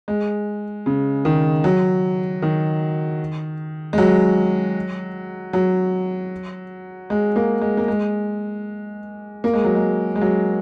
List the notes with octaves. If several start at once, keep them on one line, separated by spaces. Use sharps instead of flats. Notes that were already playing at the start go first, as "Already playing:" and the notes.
G#3
C#3
D#3
F#3
D#3
G#3
F#3
F#3
G#3
A#3
G#3
A#3
G#3
A#3
G#3
F#3
G#3
G#3
F#3